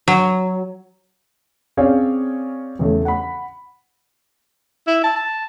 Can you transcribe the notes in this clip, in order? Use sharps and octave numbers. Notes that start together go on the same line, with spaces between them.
F#3
C4 C#4 G#4 C#5 D5 F5
E2 C#3 A3
F#5 B5
E4
A5
A5